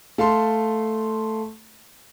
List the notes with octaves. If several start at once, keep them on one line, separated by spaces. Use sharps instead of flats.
A3 F5 A5 C6